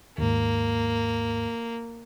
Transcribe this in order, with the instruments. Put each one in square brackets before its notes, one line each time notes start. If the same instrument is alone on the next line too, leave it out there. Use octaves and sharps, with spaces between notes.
[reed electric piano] D#2 G#2 [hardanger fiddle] A#3